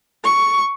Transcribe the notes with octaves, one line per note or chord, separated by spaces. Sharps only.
C#6